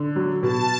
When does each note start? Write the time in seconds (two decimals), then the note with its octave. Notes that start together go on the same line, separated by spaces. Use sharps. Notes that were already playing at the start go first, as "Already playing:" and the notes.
Already playing: D3
0.16 F#3
0.43 B2 A5